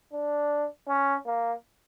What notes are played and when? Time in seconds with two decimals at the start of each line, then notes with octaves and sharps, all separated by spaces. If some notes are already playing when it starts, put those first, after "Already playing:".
0.13 D4
0.89 C#4
1.26 A#3